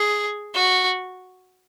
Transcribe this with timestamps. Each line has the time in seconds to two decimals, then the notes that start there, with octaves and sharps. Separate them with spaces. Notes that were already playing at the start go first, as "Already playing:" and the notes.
Already playing: G#4
0.54 F#4